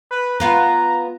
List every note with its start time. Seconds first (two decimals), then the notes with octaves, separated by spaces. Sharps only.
0.11 B4
0.40 B3 F4 B4 A#5